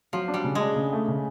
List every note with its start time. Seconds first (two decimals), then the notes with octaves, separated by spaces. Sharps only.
0.13 F3 F#3
0.28 D4
0.34 G3
0.44 C#3
0.55 G#3
0.60 D4
0.76 C#3
0.93 A3
1.08 C#3